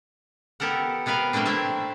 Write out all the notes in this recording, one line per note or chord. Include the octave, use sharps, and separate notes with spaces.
B3 G4 A4 A#4 F#5
C3 B3 A#4 B4 F5
F#3 G3 A3 A#3 C4 D4
C4 E4 E5 A5